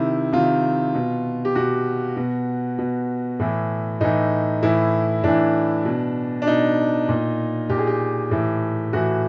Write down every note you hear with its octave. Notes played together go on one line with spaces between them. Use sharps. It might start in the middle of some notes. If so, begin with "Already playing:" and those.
Already playing: C3 D#3 E4
C3 D#3 F4
B2
G4
B2 F#4
B2
B2
A2 E3
A2 E3 D#4
A2 E3 E4
A2 E3 D4
B2
D4
B2 D#4
A#2
A#2 G4
G#4
G4
A2 E3
A2 E3 F#4